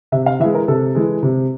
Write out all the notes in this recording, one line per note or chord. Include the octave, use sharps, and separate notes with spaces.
C3 E5
F5
E3 G#3 E5
A#4
C3 A4
E3 G#3
C3